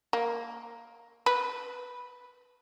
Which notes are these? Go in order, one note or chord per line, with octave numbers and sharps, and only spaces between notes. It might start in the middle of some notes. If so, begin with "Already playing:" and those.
A#3
B4